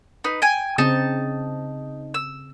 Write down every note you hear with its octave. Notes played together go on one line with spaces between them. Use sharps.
D#4 B4
G5 G#5
C#3 C4 D#4 A5
E6